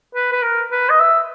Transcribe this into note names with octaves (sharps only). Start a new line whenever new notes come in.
B4
B4
A#4
B4
D#5
E5